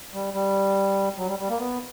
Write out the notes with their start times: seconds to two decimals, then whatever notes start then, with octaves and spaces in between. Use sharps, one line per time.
0.14 G3
0.34 G3
1.18 F#3
1.28 G3
1.39 G3
1.49 A#3
1.59 B3